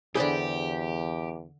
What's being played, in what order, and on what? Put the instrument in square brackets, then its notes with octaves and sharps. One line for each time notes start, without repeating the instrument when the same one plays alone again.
[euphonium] E2 [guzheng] D3 B5 [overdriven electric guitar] G4 [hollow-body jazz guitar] G#4 C5 D5